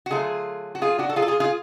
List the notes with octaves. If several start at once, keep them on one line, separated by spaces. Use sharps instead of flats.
F#4
D3 F#3 A3 F4 G#4
F#4
F4 G#4
D4 F#4
A4
F4 G#4
A4
F4 G#4
F4 G#4